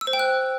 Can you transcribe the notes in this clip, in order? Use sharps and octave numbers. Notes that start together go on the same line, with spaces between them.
E6
C5
G5
F#6